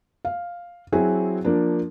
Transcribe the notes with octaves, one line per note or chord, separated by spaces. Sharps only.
F5
F#3 C4 E4 F#4 G#4
F3 A#3 D4